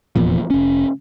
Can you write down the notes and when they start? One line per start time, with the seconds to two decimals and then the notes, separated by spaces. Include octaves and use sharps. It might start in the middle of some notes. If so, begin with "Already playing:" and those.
0.16 F1 E2 A#2 F3
0.50 F1 C#4